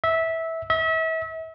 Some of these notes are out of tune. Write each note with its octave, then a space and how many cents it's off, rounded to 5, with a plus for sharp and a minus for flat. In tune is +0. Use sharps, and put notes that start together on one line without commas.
E5 -15
E5 -35